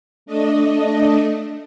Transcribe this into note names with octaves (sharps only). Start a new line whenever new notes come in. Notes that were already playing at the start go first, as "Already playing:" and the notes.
A3 D4 D#5